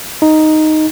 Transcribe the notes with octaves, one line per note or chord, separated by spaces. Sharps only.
D#4